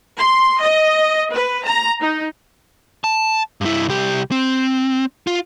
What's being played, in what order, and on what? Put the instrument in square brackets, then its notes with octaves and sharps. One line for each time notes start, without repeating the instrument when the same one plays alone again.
[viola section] C6
D#5
B4
A#5
D#4
[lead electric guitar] A5
G2 E4
C2 G4
C4
F4